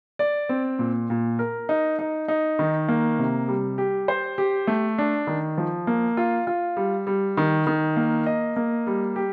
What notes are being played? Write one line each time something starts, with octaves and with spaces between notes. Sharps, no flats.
D5
C4
A#2
A#2
A#4
D#4
D#4
D#4
D#3
A#3
C3
G3
G4
C5
G4
A3
D4
D#3
F3
A#3
F4
F4
G3
G3
D#3
D#3
A#3
D#5
A#3
G3
G4